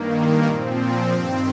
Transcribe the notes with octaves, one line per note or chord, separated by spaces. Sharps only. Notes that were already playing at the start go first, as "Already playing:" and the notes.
Already playing: G2 D#3 A#3
A#3
A#2 F3 C4
G2 D#3